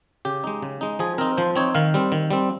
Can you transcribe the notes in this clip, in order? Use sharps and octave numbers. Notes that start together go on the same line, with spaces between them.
C#3 G4
G#3 D#4
C#3
G#3 D#4
F3 G#4
C4 D#4 A#4
F3 C5
C4 D#4 C#5
D#3 F5
G3 C4
D#3
G3 C4